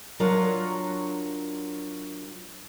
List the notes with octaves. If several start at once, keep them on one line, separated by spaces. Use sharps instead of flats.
F#3 D4 F4 A#4 C#5